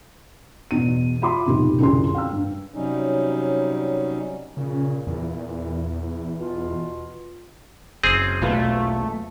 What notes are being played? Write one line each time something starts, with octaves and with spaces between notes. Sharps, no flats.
E2 B2 D#7
F4 E5 B5 C6 D6
F1 B1 C3 D#3 G4
C2 F#2 D3 F4 G#4 C6
F5 G5 E6
G2
C3 F#3 G3 C#4 D#4
A#2 C#3
E2
B2 F4
F#1 C4 G#4
B1 E2 B2 A3 A#3 F4 B4